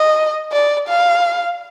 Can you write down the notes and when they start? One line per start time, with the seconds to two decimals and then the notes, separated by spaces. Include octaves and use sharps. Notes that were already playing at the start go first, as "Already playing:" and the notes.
Already playing: D#5
0.52 D5
0.88 F5